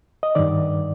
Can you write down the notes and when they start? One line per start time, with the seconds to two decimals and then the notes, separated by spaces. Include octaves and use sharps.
0.23 D#5
0.35 G2 D#3 D5